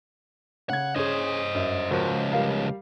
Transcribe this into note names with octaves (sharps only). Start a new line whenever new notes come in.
C#3 F#5 G#6
C#4 G#4 C5 D#5
F#2
C#2 F3 F#4 A#4 C5
G3 A#4 F5